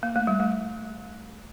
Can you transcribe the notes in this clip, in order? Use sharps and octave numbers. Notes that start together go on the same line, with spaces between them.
A#3
A3
G3
A3